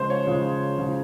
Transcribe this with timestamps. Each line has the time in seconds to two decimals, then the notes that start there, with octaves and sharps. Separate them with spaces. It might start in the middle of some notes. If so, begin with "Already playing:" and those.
Already playing: C#3 F3 G#3 C5
0.10 C#5
0.27 C#3 F3 G#3
0.79 C#3 F3 G#3